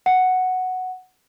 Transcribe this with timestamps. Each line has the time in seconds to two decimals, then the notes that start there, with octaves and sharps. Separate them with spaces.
0.06 F#5